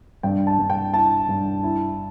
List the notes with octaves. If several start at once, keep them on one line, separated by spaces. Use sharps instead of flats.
G2 G5
A5
G2
G5
E4 A5
G2
E4